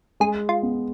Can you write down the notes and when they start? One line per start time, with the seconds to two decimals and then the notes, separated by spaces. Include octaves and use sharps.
0.20 G#3 G#4
0.49 F4
0.63 B3